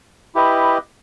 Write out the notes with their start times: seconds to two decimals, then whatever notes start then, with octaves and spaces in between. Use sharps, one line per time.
0.35 E4 G4 B4 D#5